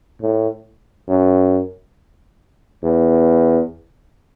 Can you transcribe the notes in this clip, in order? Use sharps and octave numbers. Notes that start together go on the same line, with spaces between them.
A2
F#2
E2